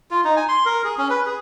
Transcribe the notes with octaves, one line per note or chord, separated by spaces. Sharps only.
F4
D#4
G#5
C6
A#4
G#4
C#4
B4
G#4